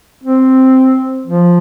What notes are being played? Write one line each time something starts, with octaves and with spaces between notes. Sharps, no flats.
C4
F3